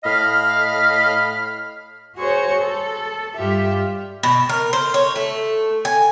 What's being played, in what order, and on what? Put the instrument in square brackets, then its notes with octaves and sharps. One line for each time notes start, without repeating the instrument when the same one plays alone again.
[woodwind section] A2 D#5 F5 B5 F6
[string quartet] F#4 G#4 C5 C#5 C#6
A4
G2 F4 G4 E5
[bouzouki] B2
A#4
C5
C#5
A3
G#5